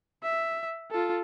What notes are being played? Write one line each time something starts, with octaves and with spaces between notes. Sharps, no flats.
E5
F4 A4